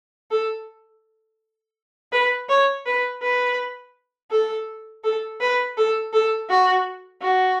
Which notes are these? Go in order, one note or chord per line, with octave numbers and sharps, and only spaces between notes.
A4
B4
C#5
B4
B4
A4
A4
B4
A4
A4
F#4
F#4